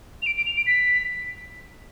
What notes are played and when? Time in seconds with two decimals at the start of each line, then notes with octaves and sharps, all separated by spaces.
0.22 F7
0.26 D7
0.37 D7
0.46 F7
0.56 D7
0.66 B6